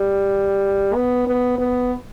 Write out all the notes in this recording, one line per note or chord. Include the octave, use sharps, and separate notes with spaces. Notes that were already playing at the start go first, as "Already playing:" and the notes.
Already playing: G3
B3
B3
B3